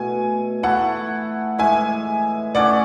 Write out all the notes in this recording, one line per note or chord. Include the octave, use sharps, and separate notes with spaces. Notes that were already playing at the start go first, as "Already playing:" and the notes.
Already playing: B2 A3 E4 G#5
E3 A3 E4 G#4 F#5 A5
A2 E3 G#3 E5 G#5
E3 A3 C#4 G#4 D5 F#5